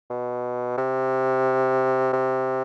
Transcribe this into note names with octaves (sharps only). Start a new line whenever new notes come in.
B2
C3
C3